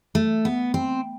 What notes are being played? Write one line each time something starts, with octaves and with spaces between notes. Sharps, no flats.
A3
B3
C4